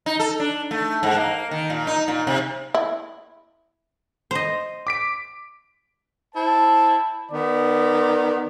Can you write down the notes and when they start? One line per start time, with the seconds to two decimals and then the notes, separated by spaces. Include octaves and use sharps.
0.06 D#4
0.20 A4
0.40 D4
0.71 A3
1.03 G#2
1.16 A#3
1.51 D#3
1.70 A#2
1.87 D#4
2.08 A#2
2.27 C3
2.75 E4
4.31 C5 D#5
4.87 D6 B6 D7
6.35 E4 C5 A5
7.32 D#3 B3 D5